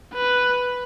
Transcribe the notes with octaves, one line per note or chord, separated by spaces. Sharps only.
B4